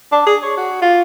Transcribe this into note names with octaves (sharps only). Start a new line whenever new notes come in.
D4
G#4
C#5
F#4
F4